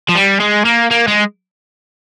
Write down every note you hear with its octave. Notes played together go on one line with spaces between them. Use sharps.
F3
G3
G#3
A#3
A#3
G#3